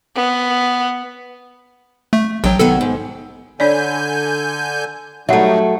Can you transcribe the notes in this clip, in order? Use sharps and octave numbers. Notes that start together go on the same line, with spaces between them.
B3
A3
A#1 F#3 G5
D#3 F#3 B3 A4
G#2
D3 D4 C#5 D5 G#5 G6
F#3 G3 A3 D#4 E5 F#5